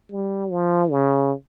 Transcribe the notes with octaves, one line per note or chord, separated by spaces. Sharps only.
G3
F3
C#3